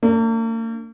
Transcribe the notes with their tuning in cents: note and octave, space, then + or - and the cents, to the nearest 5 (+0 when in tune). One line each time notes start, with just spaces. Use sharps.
A#3 -45 D4 +0